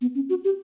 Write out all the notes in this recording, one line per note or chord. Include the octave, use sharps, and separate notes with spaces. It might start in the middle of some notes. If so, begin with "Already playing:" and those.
B3
C#4
F#4
G4